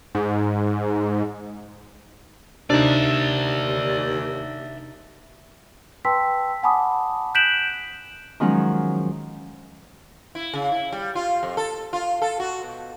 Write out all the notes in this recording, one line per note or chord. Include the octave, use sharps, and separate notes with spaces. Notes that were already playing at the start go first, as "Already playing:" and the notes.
G#2
D#2 C3 D4 D#4 D5 E5
B4 G5 A5 C6 E6 B6
F#5 G#5 A5 B5 D6 D#6
F#6 G6 B6 D7 E7 F#7
D#3 F3 F#3 G#3 C#4 D#4
E4
C#3
E4
G3
F4
F2
A4
F4
A4
F#4
B2